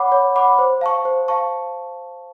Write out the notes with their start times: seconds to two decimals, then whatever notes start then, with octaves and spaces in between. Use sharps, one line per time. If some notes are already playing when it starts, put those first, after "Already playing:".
Already playing: C#5 F#5 B5 D6
0.12 C#5
0.36 F#5 B5 D6
0.59 C5
0.81 F5 A5 C#6
1.05 C5
1.28 F5 A5 C#6